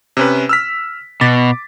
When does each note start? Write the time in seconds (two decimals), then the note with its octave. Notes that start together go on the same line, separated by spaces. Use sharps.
0.17 C3 C#4 B4
0.49 E6 F6 B6
1.21 B2 D6 A6 B6